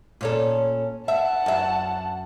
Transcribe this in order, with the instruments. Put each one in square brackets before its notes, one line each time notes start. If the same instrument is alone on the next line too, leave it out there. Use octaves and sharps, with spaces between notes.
[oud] A#2 C#4 A4
[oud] E5 [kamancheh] F#5 A5
[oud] F#2 E5